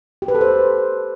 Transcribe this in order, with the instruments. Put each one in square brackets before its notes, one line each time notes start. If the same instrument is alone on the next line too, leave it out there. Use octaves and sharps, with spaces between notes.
[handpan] G4
B4
A4
C5